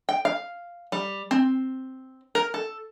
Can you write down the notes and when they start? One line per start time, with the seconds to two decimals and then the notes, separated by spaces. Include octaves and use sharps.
0.09 G5
0.25 F5
0.92 G3
1.31 C4
2.35 A#4
2.54 A4